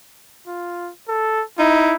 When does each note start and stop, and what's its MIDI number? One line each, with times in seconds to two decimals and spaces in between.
0.47 0.91 65
1.09 1.43 69
1.59 1.94 63
1.59 1.95 64